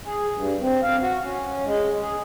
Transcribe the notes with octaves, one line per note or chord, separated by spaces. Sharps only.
G#4
G2
C4
F5
F#4
C#4
G#3
G#4